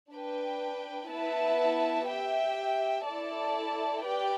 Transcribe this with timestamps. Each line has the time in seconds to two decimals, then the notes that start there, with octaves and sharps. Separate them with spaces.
0.11 D4 B4 G5
1.09 B3 E4 B4 E5 A5
2.08 G4 E5 G5
3.06 E4 A4 D5 A5
4.04 G4 B4 D5 G5